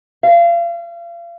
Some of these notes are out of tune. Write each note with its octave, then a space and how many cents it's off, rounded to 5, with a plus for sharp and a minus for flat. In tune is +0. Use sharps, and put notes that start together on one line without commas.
F5 -35